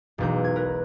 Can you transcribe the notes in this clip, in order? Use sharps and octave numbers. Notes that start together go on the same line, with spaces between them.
E1 B1 G6
G#6
A#4 B4